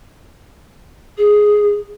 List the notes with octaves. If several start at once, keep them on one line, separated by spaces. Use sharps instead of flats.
G#4